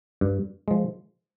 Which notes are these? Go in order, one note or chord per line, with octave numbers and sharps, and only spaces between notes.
G2
F3 G#3